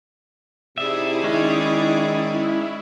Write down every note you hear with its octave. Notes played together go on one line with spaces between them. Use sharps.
C3 D#4 E4 G#4 D5 E5
D#3 G#3 C#4